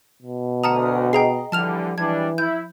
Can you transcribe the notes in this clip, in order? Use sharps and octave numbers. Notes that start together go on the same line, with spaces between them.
B2
D2 F#5 A5 A#5 D#6 F6
G#4 D#5 G5 A#5 C7
D3 E3 F3 G3 A5 F6 F7
E3 G3 G#3 D4 G#6
E4 G6